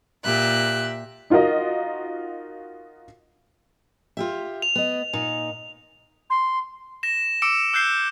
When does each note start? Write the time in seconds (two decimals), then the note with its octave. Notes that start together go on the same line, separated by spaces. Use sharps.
0.25 A#2 G4 E5 F#6
1.30 D#4 F4 F#4 A#4 D#5
4.17 F4 G4 E5
4.62 F7
4.75 B3 D#5
5.13 A#2 D#4
6.30 C6
7.03 A#6 E7
7.42 D6 E6 C#7 D7 E7
7.73 E6 F#6 G6 C7 G7